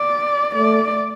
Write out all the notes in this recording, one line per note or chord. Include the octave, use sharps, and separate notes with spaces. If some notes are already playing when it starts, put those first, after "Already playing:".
Already playing: D5
A3 D5